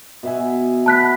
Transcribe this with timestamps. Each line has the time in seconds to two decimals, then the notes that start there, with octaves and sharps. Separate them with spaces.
0.23 B2 E5 G#5
0.86 B4 F#5 A5 F#6 B6